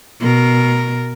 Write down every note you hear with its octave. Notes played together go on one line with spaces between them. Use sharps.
B2 A#4